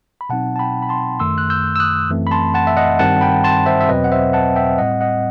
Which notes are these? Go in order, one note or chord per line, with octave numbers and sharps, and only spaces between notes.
B5
B2 F#3 C4 D#4 F#5 A5
A5
G5 B5
B5
A5 C6
F#2 D#3 A3 C6 E6
F#6
E6 G6
E6
D#6 F#6
F#2 E3 A3 C4
B5
A5 C6
F#5 A5
E5
D#5 F#5
G2 D#3 G3 C4 F#5 A5
G5 B5
A5 C6
C5 E5
E5
E2 B2 F#3 C4 B4 D#5
F#5
C5 E5
F#5 A5
E5 G5
A2 G3 C4 D#5 F#5
D#5 F#5